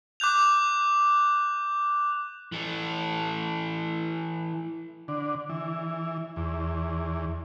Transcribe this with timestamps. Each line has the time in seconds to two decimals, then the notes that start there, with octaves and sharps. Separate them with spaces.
0.20 D6 F#6 G6 F7
2.52 E3 A4
5.08 D3
5.49 E3
6.36 E2